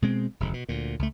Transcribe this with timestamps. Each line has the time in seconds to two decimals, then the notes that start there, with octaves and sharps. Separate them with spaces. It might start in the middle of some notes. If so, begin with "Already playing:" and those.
0.02 B2 G#3 C4
0.40 F1 D2 G#2
0.54 B2
0.69 D2 A#2
0.99 C#2 A3